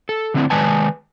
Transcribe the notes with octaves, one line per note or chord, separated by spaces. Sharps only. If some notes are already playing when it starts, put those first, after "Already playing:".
A4
D3 A3 C4 D4 E4
D#3 G#3 B4 D5 G#5 A5